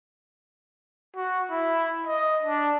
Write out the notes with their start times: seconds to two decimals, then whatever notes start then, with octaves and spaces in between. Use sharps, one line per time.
1.16 F#4
1.51 E4
2.07 D#5
2.42 D4